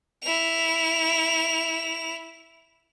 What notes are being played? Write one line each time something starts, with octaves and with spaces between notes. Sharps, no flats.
E4 F7